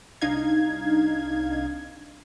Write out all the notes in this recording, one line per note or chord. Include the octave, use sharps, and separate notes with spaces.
C2 D4 D#4 F5 G#6